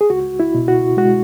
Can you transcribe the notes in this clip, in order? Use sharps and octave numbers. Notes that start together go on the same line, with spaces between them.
G#4
C#2 F#4
E4
B2
F#4
G#3 F#4